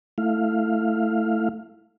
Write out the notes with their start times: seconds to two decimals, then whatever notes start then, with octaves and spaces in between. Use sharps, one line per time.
0.18 A3 E4 F5